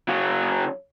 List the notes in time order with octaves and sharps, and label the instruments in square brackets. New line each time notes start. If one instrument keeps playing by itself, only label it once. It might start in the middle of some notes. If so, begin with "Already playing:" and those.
[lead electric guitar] C#3 F#3